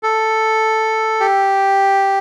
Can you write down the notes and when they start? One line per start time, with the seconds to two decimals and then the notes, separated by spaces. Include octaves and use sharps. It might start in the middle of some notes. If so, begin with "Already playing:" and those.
0.03 A4
1.20 G4